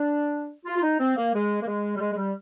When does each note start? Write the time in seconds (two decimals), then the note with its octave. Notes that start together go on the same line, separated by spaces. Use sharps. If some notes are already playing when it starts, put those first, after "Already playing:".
Already playing: D4
0.66 F4
0.76 F4
0.82 D#4
1.00 C4
1.16 A#3
1.33 G#3
1.62 A#3
1.67 G#3
1.96 G3
2.00 G#3
2.13 G#3
2.17 G3